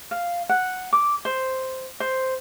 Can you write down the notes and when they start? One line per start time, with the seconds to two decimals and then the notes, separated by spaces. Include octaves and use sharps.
0.11 F5
0.49 F#5
0.93 D6
1.25 C5
2.00 C5